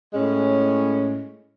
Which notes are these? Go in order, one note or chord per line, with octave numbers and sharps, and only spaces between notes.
A2 G#3 C#4